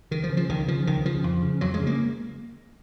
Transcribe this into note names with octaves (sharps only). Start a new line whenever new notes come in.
C#2 D#3
F3
C#3
F3
C#2 D#3
C#3 F3
C#2 D#3
C#3 F3
F2
C#3
F2 F#3
G#3
C#3
A#3